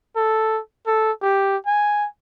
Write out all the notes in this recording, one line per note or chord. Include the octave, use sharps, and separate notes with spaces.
A4
A4
G4
G#5